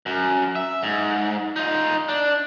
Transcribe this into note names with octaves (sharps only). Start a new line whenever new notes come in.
F#2
E5
G#2
D#4 F4
D4